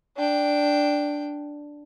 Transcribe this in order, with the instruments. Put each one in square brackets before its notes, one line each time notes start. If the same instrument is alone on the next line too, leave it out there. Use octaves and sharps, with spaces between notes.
[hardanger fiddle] D4 G5